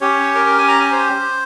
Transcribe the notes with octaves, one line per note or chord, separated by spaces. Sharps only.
C#4 G4 C#5
A#4
A#4
G#5
A#5
G#5
C5